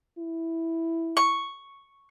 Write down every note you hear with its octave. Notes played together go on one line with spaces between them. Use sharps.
E4
C#6